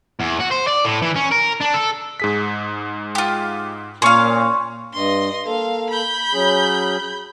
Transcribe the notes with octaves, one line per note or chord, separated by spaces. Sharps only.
E2
F#4
C5
D5
A2
E3
C#4
A#4
D4
A4
G#2 G#4 B6
F4 G4
A#2 C#4 F5 C6 C#6
G2 D#5 C6
A#3 A4 F5
B5 G6
F#3 C#4 G#4